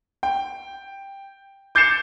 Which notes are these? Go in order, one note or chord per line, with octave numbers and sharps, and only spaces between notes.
G5
D6 G6 A6 C7 C#7 E7